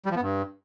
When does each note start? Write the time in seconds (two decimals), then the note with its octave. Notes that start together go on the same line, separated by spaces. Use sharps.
0.06 G3
0.11 F3
0.16 B3
0.21 G2